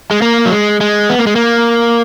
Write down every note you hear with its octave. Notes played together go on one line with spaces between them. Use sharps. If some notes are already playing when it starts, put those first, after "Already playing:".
G#3
A#3
F#3
G#3
G#3
B3
A#3
G#3
A#3